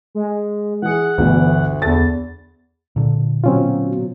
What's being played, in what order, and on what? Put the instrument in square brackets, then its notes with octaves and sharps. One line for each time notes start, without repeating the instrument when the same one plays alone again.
[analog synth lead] G#3
[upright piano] E3 G#4 [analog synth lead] F#5
[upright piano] G1 B2 [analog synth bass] D2 [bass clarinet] E3
[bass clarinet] E2 [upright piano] A4 A6
[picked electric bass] A#2 D3
[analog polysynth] B2 F#3 [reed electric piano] C4 C#4 F4